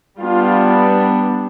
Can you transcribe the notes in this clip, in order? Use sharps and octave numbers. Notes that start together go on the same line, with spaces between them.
G3 B3 D4 F4